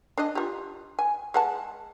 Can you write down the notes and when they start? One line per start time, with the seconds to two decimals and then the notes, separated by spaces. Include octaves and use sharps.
0.18 D4 D5 D#5
0.35 F4 G4
0.99 G#5
1.34 G#3 F#5 A5